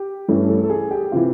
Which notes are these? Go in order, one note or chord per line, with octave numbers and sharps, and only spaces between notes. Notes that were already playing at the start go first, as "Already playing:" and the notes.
Already playing: G4
G2 E3 A3 C#4
A4
A4
G#4
G4
C3 E3 F4